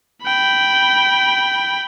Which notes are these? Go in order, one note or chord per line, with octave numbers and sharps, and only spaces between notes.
G5 B5